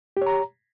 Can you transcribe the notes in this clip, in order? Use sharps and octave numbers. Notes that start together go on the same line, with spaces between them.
G4 C#5 A#5